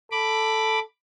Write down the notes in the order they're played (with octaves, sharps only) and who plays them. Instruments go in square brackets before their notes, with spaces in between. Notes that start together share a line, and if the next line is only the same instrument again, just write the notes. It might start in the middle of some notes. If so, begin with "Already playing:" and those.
[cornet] A4 [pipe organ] B5 D6